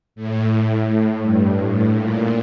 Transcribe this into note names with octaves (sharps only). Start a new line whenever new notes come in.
A2
A2
A2
G2
A2
A#2